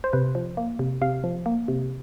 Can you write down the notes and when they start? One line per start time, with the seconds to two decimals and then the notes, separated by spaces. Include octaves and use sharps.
0.04 C5
0.13 C3 B4
0.35 F3
0.57 A#3
0.79 C3
1.02 C3 F5
1.24 F3
1.46 A#3
1.68 C3